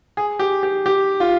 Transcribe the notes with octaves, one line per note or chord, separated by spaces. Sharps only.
G#4
G4
G4
G4
F4